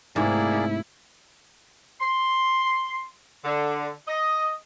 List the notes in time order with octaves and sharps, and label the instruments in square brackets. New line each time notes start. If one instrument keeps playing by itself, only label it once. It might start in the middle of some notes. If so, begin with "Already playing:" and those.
[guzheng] G#2 C3 E5 [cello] A3 E4 [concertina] A#3 G#4 D5
[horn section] C6
D3
D#5